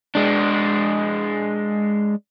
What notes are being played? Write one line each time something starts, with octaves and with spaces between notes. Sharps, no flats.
G#3 D4